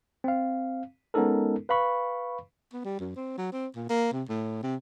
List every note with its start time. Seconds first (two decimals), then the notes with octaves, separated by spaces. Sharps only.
0.24 C4 F5
1.14 G#3 B3 C#4 D#4 A4 A#4
1.69 B4 F5 B5 C#6
2.73 B3
2.85 G3
2.99 F#2
3.16 C4
3.38 F#3
3.52 C4
3.76 A#2
3.90 A#3
4.12 C3
4.29 A2
4.63 C3